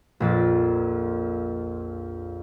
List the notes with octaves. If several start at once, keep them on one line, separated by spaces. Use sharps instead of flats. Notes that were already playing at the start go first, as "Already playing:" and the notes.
A#1 F2 A6